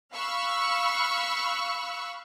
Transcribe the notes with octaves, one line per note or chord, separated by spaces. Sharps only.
F5 B5 C#6 E6 F#6